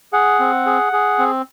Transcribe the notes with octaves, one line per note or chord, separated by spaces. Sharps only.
G#4 F#5
C4
G#4
G#4
C4